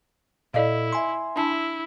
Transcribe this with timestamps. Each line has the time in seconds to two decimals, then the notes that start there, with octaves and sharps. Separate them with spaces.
0.54 A#2 E4 A4 D5 D#5 F5
0.92 E5 G#5 C6
1.36 D4 E4 A5